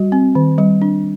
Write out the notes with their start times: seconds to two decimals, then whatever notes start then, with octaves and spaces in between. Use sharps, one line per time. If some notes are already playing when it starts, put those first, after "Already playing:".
Already playing: G3 F#4
0.12 C4
0.35 D#3
0.58 G3
0.82 D4